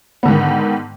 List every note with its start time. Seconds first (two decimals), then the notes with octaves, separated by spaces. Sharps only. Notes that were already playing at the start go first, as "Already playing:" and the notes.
0.23 B3
0.25 D3
0.28 G#2
0.31 D#3